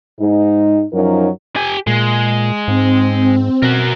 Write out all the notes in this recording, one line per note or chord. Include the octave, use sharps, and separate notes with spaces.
G#2 D#4
F#2 F3 F#3 D#4 A#4
G4 G#5
A#2 G#3
G#2 C4
B2 F#4 A#4